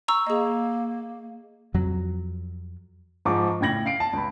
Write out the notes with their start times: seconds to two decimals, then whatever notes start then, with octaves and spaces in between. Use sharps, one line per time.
0.08 A#5 C#6 E6
0.27 A#3 G#4 D#5
1.74 F2 F#3
3.25 G#2 F3 G#4 A#5 C#6 D6
3.61 A2 C#3 G5 G#6 A#6 F#7
3.86 F5 C7 D7
4.00 A5
4.13 C#2 B5